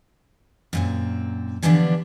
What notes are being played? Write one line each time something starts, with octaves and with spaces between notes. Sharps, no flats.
F#2 A#2 C4
D3 E3 F3 G3 B3 D4